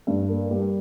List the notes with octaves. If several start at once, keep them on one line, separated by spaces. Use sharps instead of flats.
G2
A#3
G3